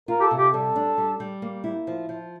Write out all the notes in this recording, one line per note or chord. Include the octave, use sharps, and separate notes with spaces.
F4 A#4
G4
A4
C3
G4
G3 A4
D4
G3
G3
A#3
E4
F3
F3